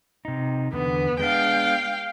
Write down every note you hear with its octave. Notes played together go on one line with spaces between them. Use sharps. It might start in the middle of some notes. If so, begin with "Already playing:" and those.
C3 D#4
E2 D3 B3
G#3 B3 D4 F5 G5